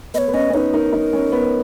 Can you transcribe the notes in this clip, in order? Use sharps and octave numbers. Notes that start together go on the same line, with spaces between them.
B3 C#5 D#5
B3
C#4 D#5
C#4
D#4 B4 C#5
D#4 A#4
D#4
C#4
B3